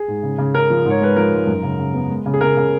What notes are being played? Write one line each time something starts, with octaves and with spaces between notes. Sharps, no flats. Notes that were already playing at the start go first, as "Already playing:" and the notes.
Already playing: G#4
G#2
C#3
C#3
C#3 A#4
F3
G#2
C#5
G#3 B4
F3 A#4
G#2
F#2
C#3
C#3
B3
G#3
C#3
G#4
C#3 A#4
C#3